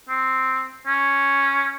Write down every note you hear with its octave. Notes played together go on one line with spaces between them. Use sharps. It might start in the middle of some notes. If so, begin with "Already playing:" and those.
C4
C#4